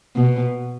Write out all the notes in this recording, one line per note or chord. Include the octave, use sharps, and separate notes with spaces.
B2